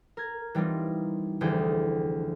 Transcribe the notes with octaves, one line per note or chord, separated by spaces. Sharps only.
A#4 G#6
E3 G3 C4 D#4 F4
F1 D2 E3 G#4 G5